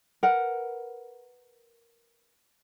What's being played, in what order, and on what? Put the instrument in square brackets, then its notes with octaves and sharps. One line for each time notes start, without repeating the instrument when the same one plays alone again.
[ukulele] A#4 B4 F#5